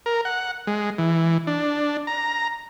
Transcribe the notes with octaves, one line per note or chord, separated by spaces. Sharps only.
A#4
F#5
G#3
E3
D4
A#5